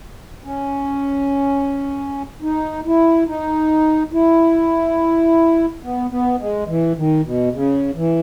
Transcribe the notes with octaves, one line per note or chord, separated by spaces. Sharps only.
C#4
D#4
E4
D#4
E4
B3
B3
G#3
E3
D#3
B2
C#3
E3